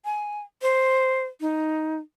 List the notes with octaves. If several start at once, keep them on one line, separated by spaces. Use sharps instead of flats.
G#5
C5
D#4